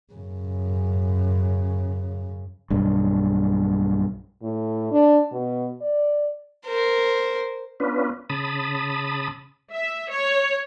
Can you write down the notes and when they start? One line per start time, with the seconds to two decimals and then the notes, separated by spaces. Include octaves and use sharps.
0.13 F#2 C#3
2.70 B1 G2
4.43 A2
4.91 D4
5.32 B2
5.81 D5
6.66 A#4 C5
7.80 B3 C#4 D4 F4 B4
8.30 C#3 A5 B5 D#6
9.72 E5
10.11 C#5